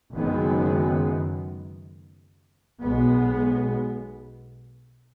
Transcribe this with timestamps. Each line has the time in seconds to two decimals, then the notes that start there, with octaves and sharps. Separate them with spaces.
0.14 F#1 F#2 D#3 G#3 B3
2.81 B1 B2 G#3 B3